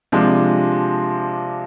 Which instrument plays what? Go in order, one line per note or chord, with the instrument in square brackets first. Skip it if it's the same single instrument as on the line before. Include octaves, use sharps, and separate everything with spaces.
[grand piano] C3 F3 G#3 D4